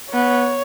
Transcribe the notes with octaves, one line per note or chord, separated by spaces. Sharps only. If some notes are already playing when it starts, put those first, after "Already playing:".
B3 C#5